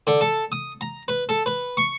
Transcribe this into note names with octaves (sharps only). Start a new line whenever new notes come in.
D3
A4
D#6
A#5
B4
A4
B4
C#6